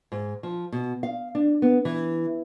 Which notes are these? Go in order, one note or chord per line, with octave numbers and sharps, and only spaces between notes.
G#2
F3
B2
F5
D4
B3
E3